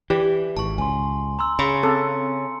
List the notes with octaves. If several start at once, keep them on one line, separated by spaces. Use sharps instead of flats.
E3 G4 D5
G#1 A5 C#6
C#2 G#5 C6
A#5 C6 E6
C#3 G#4 B5 C#7
C4 A4